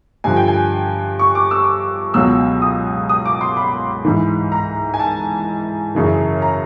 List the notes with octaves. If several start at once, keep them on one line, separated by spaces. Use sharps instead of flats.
G2 D3 F3 G#5
G5
G#5
C#6
D6
E6
C#2 B2 F#3 E6
D#6
D#6
D6
C6
B5
G#2 E3
A#5
G#5
A5
F#2 C#3 E3
A#5